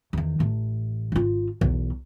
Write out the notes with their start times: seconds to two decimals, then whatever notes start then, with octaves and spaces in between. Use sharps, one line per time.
0.13 E2 D#3
0.40 A1
1.12 G#1 F4
1.61 B1 E2